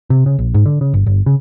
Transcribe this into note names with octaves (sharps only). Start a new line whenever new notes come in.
C3
C#3
A#1
G#2
D3
C#3
G1
G1
C#3